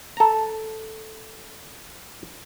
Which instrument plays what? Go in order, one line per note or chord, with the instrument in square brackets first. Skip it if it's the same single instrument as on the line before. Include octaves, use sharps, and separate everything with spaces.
[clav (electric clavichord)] A4 A#5